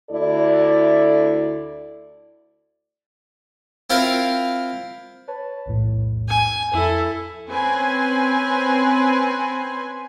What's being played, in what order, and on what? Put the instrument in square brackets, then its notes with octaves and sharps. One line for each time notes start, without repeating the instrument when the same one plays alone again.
[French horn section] D2 E4 A4 D5
[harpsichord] C4 E4 F4 A#4 F5
[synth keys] B4 C#5 A5
B1 E2 A2
[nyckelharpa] G#5
[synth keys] F2 [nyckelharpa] E4 A4
[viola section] C4 C#4 B4 G#5 C6